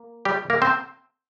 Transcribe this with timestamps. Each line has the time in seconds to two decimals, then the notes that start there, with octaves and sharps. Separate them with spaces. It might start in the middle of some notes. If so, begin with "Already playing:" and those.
Already playing: A#3
0.25 G3 G4
0.50 A#3 A#4
0.62 C4 C5